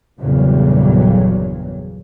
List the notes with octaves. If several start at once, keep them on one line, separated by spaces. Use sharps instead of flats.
G1 E2 A#2 C#3 F#3 G3